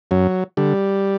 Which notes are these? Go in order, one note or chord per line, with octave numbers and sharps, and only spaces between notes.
F#2 F#3
D3 G3